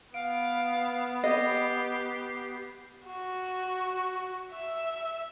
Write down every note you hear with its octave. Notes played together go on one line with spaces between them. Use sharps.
B3 F5 D7
G4 D#5 C7
F#4
E5